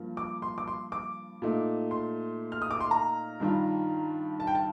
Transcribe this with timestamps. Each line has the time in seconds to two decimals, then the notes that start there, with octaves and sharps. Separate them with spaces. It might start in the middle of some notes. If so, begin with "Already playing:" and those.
Already playing: G2 F3 A#3
0.17 D6
0.42 C6
0.58 D6
0.68 C6
0.92 D6
1.42 A#2 A3 D#4
1.91 C6
2.52 F6
2.62 D#6
2.71 D6
2.80 C6
2.91 A#5
3.40 G2 D#3 G3 D4 F4
4.40 A5
4.47 G5
4.55 A5